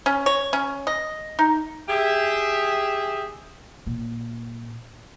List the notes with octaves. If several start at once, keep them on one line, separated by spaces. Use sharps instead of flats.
C#4
C#5
C#4
D#5
D#4
G4 G#4 E5
A#2